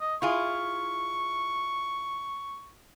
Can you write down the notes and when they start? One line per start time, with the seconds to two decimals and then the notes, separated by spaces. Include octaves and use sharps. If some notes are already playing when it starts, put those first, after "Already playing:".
0.01 D#5
0.22 E4 F4 G#4 C#6